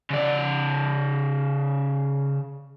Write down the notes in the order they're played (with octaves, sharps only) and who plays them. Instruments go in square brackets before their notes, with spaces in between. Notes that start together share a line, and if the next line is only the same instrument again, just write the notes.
[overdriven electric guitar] C#3 D5